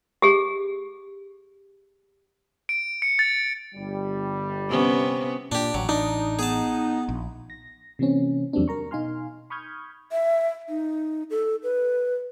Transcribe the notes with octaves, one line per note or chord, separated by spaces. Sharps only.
G4 G#4
D7
C#7
A6
G1 G3
C3 B3 C#4
A#2 D4 G4
A1 F#3
D4 D#4
B3 G#4 A5
A#1
A#6
C3 E3 A#3 C4 C#4
E2 F#3 G3 A#3 C4 D4
A#4 A#5 C#6
B2 D#4 F5 G#5 C6 F6
B5 C#6 D#6 F6 G6 G#6
E5
D#4
A4
B4